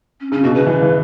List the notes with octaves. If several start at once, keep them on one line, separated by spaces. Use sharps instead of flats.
C#4
C#3 C#4
B2 F#4
C#3 B4
E3
E3